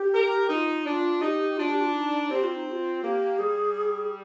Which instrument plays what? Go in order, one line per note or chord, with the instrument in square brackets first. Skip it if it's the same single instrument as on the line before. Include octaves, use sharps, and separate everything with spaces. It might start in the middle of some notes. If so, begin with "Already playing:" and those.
Already playing: [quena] G4
[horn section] A#4
[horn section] D#4 [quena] F4 G4
[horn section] D4 [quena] F4
[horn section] D#4 [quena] G4
[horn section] D4 [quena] F4
[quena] G4
F4
D#4
[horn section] C4 [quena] G4
[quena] F4
D#4
G4
F4
[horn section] A#3 [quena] G4
[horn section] G3 [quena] G#4